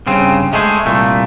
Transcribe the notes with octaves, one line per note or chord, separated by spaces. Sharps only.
G2 C#3 C4
G#3 A3 G#4 C5
C2 A#2 A3